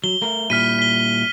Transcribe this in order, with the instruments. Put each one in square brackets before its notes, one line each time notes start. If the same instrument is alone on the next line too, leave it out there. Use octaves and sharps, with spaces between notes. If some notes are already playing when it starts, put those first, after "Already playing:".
[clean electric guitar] F#3 [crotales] G7
[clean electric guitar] A3 A#4
[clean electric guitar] A#2 G3 E4 [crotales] F6 B6 D#7
[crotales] B6 G7